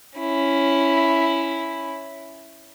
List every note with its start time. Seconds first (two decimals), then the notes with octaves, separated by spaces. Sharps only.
0.19 C#4 E4